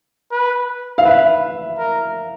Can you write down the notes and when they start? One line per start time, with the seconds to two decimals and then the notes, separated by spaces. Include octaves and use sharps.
0.31 B4
0.98 F5
1.05 B4 E5
1.78 A#4